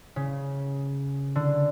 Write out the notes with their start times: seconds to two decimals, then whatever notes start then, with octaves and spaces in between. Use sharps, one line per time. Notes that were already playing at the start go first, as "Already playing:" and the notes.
0.16 C#3
1.36 D3